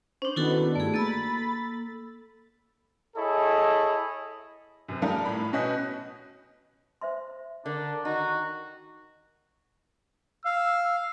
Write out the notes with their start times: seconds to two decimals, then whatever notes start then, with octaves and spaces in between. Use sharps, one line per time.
0.22 C#4 D4 C5
0.36 D#3 B3 D4 E4 F#4 A4
0.75 G2 A3 E4 G#4
0.94 A#3 A4 B5 E6 A6
3.17 E4 G#4 A4 C#5 D#5
4.88 F#2 C3
5.02 G3 D#4 F4 A4 A#4
5.25 A2 B5
5.53 B2 C#4 F#4 D#5 G6 B6
7.01 C5 E5 C6
7.66 D3 D4 A#4 D5
8.05 D#3 D#4 F#4
10.45 F5 E6